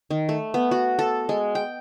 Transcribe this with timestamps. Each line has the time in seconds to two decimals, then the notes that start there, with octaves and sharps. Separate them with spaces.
0.11 D#3
0.29 A3
0.54 B3
0.71 F#4
0.99 A4
1.29 G#3
1.55 G5